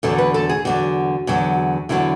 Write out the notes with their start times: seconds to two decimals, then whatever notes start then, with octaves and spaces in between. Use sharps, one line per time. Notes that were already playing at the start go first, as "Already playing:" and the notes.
0.03 E2 D3 F#3 A4
0.18 B4
0.34 A4
0.49 G#4
0.65 E2 D3 F#3 F#4
1.27 E2 D3 F#3
1.89 E2 D3 F#3 E4